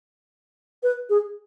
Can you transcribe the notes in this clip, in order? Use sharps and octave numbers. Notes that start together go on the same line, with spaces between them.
B4
G#4